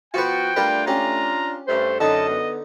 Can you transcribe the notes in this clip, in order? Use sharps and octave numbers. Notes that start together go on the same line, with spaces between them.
F3 B3 F4 F#4 B4 G5
G3 A3 D4 F4 A#4 B4
C#4 G4 A#5
G2 A3 C5
F#2 D3 D#4 D#5 A5
B3